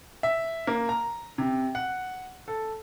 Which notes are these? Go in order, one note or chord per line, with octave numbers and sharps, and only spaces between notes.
E5
A#3
A#5
C3
F#5
A4